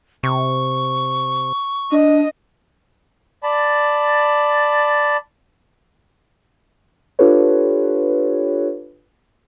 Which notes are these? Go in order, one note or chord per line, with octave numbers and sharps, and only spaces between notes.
C3 C#6
D4 D#5
D5 A5 B5
D4 F4 G4 A4 B4 C#5